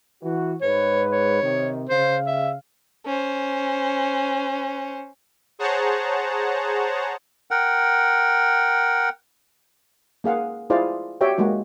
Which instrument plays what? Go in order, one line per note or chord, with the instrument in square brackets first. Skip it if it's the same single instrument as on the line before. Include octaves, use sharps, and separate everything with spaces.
[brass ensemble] E3 F#4
[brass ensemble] G#2 B4 [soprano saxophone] C#5
[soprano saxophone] C#5
[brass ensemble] C3 D#3
[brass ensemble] C#3 F5 [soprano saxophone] C5
[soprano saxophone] E5
[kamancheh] C#4 C5
[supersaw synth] G#4 C5 C#5 F#5 A5 A#5
[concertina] A#4 F#5 G5
[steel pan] A#3 G#4 F5 F#5
E4 F4 G#4 C5 D5 F5
F#4 G4 C#5 D5 E5 G5
G#3 A#3 F#4